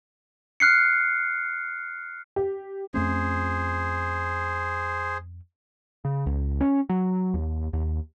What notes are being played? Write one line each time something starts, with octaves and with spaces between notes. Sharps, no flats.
F6 F#6 C7 C#7
G4
F2 A3 C#4 G#4 C5
C#3
C#2
C#4
F#3
D#2
D#2